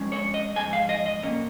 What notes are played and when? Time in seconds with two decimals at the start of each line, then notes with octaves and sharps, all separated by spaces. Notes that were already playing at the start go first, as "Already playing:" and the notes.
Already playing: F2 F3 G#3 C#4
0.12 C#5
0.34 D#5
0.56 G#2 F3 G#3 G#5
0.73 F5
0.89 D#5
1.06 D#5
1.22 A#2 A#3 C#4